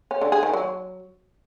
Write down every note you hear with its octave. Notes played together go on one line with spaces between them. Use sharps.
C#4
D3
G#4
D#3
F#3